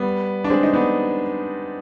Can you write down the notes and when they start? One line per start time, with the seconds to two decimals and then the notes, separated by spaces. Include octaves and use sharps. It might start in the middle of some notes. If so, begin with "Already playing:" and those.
Already playing: G3 B3
0.44 D4
0.50 G#3 C4
0.63 D#4
0.73 B3 D4